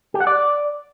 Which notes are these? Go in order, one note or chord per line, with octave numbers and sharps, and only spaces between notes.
G4
F#5
D5